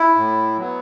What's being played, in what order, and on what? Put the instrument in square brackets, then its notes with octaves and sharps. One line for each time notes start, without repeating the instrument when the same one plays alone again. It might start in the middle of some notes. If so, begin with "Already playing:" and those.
Already playing: [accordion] E4
A2
F#3 B3